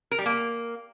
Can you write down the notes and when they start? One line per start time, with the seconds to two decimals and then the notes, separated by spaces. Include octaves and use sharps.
0.11 A#4
0.19 G3
0.26 A#3